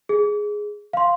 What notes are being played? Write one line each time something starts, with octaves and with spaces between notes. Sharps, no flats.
G#4
F5 C6